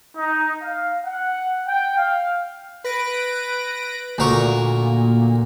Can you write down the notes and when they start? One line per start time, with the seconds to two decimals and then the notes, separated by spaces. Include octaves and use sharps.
0.15 D#4
0.62 F5
1.04 F#5
1.67 G5
1.97 F5
2.84 B4 A#6 D7
4.18 D2 A#2 A#4 C#6